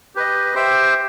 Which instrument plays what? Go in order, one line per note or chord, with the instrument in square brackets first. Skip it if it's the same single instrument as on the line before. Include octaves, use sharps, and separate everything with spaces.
[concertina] G4 B4 D#5
G4 C5 E5 G5